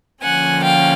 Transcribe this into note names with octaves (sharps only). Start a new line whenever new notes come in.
D3 F3 A#3 C#4 F#5 G#5
F5 G5